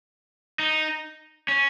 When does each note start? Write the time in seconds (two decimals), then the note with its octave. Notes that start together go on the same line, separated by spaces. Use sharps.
0.59 D#4
1.48 C#4